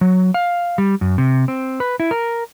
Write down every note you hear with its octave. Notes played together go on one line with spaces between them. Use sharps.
F#3
F5
G3
F#2
C3
C4
B4
E4
A#4